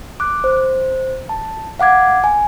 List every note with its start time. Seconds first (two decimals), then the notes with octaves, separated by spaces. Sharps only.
0.20 D6 F#6
0.44 C5
1.29 A5
1.79 F5 F#5 D6 G#6
2.24 G#5